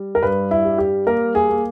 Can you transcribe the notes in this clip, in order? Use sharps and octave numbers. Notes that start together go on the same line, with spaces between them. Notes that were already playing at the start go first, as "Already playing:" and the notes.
Already playing: G3
A#4
G2 B4
E4
G3
G4
A#3 A#4
G#4
A#3